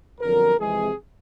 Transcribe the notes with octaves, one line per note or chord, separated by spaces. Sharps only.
G1 F2 D3 F#3 A#4
F2 C3 E3 G#3 G#4